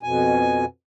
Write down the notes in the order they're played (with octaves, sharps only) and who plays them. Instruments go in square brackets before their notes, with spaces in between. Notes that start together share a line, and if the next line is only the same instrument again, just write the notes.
[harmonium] F2 B2 G#5